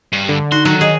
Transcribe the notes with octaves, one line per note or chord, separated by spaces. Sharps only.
G2
D3
D#4 F#4 C6
D#3 F#3
G#4 D#5